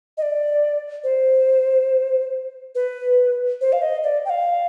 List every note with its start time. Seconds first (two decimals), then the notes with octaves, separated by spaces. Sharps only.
0.17 D#5
0.22 D5
1.04 C5
2.75 B4
3.61 C5
3.73 F5
3.82 D#5
4.03 D5
4.25 G5
4.30 F5